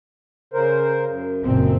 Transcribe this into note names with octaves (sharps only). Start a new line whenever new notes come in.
C#3 A#4 C5
F#2
F#1 F#2 A#2 C4